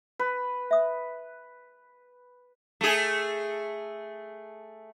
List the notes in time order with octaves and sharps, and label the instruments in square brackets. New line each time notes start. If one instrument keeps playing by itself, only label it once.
[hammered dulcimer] B4
[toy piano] E5 D#6
[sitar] A3 G#4